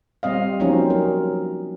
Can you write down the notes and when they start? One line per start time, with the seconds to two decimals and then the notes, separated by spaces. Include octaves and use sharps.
0.23 G3 C4 D#5 F5
0.60 F3 F#3 A#3 C4 C#4 D#4
0.90 A#4